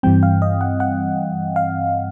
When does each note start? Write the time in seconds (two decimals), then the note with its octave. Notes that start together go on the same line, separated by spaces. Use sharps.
0.03 G2 E3 G3 C4 G5
0.23 F5
0.42 D#5
0.61 F#5
0.80 F#5
1.56 F5